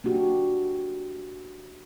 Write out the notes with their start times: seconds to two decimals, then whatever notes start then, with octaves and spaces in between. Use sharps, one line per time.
0.04 A#3 D4 F#4 G4